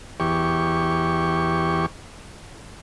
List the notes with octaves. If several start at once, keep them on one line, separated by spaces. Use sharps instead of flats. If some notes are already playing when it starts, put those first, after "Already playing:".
E2 G4 C#6